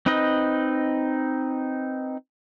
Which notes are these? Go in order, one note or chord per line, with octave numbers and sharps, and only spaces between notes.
C4 D#4 B4 D#5